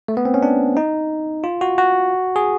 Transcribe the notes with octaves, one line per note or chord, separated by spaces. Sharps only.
A3
B3
C4
C#4
D4
D#4
F4
F#4
F#4
G#4